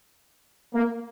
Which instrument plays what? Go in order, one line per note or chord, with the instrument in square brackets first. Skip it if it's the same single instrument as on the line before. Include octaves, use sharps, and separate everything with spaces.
[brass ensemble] A#3